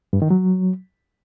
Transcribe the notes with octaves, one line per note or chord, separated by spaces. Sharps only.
G2
D#3
F#3